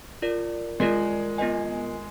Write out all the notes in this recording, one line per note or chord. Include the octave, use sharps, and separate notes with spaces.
F4 A#4 D5
G#3 F4 A#4 D5
B3 F4 A#4 D#5 G#5